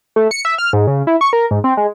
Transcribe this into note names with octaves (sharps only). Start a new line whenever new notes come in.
A3
C#7
E5
F6
G#2
C#3
E4
C#6
A#4
G#2
C4
G#3